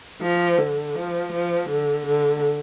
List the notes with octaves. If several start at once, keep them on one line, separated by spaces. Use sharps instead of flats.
F3
D3
F3
F3
D3
D3